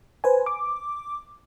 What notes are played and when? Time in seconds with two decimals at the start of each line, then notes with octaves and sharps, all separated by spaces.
0.24 B4 C5 G#5
0.46 D6